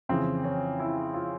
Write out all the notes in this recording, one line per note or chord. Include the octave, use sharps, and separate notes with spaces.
F2 C#3 E3 C4
C#4
E4
F4